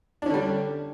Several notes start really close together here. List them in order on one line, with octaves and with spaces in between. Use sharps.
D4 C#4 D3 G3